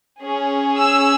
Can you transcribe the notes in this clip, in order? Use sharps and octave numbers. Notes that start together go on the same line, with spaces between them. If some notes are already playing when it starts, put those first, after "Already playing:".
C#4 G#4
E6